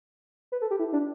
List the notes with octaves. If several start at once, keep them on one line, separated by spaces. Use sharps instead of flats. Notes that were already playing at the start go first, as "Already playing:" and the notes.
B4
A4
G4
E4
D4